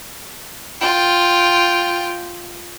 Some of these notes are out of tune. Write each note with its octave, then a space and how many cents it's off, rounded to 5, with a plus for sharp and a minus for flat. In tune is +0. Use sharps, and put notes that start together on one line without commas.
F4 +0 G5 +0